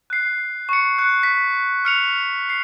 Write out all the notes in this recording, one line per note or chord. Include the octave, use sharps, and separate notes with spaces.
F#6 C7
C#6 C#7
F#6 C#7
B6
F6 C#7 F7
C7